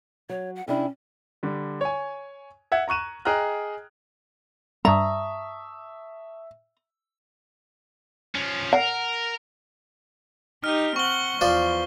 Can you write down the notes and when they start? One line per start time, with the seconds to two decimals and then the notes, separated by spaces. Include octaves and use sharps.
0.29 F#3 C#5
0.56 F#5
0.68 C3 C#4 D4 E4
1.43 D3 G3
1.81 C#5 G#5
2.72 E5 F#5 G#6
2.88 A#5 C#6 F#6 D#7 E7
3.25 G#4 D#5 G5 A#5 F6 F#6
4.85 G2 G3 E5 A5 A#5 C#6 D#6
8.35 F3 C#4
8.73 A#4 F#5
10.64 D#4 G4 F6
10.96 C4 F#5 C#6 G7
11.41 E2 F3 C5 D5